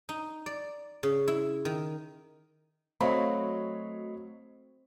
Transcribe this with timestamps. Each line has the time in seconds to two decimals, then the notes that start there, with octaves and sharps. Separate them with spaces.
0.09 D#4
0.46 D5
1.03 C#3
1.28 E4
1.65 D#3
3.01 F#3 A3 C4 C#5 D#5 F5 B5